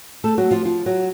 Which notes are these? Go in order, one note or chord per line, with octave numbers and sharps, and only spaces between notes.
A3 A4
F#3 F#4
F3 F4
F3 F4
F#3 F#4